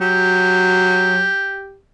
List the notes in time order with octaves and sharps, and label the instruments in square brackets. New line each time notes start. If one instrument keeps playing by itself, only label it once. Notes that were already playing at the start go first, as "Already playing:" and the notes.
[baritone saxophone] F#3 [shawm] G4